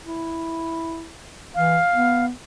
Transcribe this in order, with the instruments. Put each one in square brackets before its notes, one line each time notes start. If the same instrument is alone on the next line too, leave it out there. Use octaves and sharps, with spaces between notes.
[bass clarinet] E4
[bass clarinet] E3 [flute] F5
[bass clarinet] B3